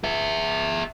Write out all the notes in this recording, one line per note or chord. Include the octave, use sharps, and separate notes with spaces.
G#4 E5